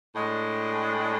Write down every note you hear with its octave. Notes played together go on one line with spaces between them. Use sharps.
A2 G#3 D4